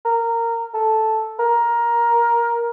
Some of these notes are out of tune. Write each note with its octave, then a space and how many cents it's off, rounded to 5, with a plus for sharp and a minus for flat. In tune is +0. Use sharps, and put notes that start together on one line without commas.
A#4 -15
A4 -5
A#4 +15